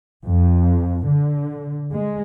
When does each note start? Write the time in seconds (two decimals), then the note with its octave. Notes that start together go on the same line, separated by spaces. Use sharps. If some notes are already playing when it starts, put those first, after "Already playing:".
0.23 F2
1.05 D3
1.91 G#3